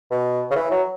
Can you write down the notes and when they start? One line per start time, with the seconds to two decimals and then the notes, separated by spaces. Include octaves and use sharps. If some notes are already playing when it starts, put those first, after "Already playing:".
0.11 B2
0.50 C#3
0.56 E3
0.71 F#3